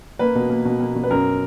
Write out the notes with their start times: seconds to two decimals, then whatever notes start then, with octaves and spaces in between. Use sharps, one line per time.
0.19 A#3 B4
0.35 B2
0.50 A#3
0.65 B2
0.80 A#3
0.95 B2
1.03 B4
1.11 F#2 A#4